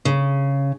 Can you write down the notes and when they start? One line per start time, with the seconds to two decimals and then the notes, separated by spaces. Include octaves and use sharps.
0.05 C#3